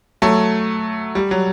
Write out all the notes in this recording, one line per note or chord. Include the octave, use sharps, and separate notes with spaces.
F#3 A3
G3
F#3